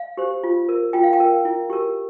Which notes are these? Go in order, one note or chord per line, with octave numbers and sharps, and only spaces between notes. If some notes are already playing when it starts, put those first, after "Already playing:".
Already playing: F5
G4 C5
F4
A#4
F4 G5
F5
G5
A#4
E4
G4 A#4